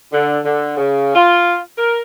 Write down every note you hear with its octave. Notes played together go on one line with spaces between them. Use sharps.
D3
D3
C#3
F4
A#4